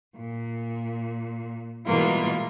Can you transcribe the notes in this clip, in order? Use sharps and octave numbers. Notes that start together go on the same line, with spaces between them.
A#2
B2 E3 G3 G#3 A#3 F4